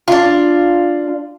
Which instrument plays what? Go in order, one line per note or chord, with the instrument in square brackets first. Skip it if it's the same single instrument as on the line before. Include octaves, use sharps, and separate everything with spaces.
[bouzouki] D4 F4